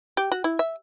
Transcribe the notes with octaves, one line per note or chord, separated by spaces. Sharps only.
G4
F#4
E4
E5